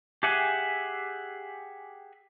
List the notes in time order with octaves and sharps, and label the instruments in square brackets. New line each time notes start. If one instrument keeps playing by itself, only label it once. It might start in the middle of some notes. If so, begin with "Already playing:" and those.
[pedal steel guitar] G4 G#4 E5 F#5 G#5